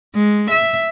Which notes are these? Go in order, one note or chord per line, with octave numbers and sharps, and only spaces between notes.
G#3
E5